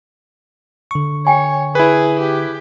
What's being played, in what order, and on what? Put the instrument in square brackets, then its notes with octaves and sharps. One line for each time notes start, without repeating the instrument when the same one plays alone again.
[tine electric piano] D3 C#6
[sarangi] C#5 [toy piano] G5 G#5
[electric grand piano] E4 B4 [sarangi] G#4
[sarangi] G4